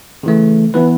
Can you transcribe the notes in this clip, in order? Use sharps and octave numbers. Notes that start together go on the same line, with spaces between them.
C#3 E3 A3
E3 B3 E4 B4